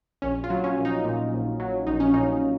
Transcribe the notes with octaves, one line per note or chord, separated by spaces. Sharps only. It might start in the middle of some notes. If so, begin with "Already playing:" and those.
A#1 C#4
F4
F#3
C#4
A#1
D#4
A#2
A#1
F#3
A#1 D#4
C#4
A#2 D#4